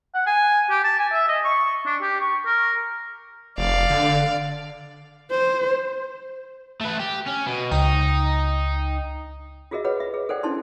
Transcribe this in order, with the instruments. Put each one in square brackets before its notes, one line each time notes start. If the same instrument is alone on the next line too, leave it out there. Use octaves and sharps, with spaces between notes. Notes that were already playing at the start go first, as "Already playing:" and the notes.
[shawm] F#5
G#5
G4
A5
G#5
E5
D#5
C#6
D4
G4
C#6
A#4
[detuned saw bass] F1 [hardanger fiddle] D5 F5
[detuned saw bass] D3
[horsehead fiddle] C5
[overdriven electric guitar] A3 B4
G4
C#4
B2
[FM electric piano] C#2 G5 [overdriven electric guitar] D#4
[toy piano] F4 F#4 G#4 A#4 D#5 E5
G#4 B4 C#5 D#5 F#5 B5
E5
G#4
A4 A#4 C5 D5 F#5 G5
C#4 D4 E4 A5 C6